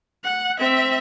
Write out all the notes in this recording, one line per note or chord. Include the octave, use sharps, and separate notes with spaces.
F#5
C4 E5